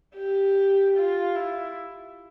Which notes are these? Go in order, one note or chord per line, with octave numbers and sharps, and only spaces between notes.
G4
F4
E4